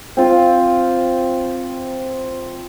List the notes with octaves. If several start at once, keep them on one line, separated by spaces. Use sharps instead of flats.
C4 F4